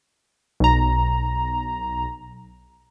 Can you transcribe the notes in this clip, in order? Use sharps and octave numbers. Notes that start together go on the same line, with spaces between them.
B1 A#5